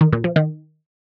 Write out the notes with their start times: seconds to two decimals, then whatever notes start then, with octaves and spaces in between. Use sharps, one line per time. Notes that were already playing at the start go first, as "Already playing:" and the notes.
0.01 D#3
0.13 A#2
0.24 F3
0.36 D#3